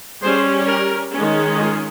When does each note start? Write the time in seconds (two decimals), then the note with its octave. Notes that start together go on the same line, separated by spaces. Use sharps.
0.22 G3 C#4 G#4 C5
0.68 G4 A#4
1.14 D#3 G#3 C#4
1.59 F4 G#4